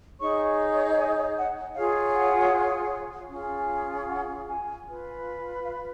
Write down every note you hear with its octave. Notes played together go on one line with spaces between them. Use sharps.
D#4 G#4 C#5 C#6
G#5
F#5
F4 G#4 C#5 F5
F#5
C#4 F4 G#4
F#5
G#5
F4 B4
F5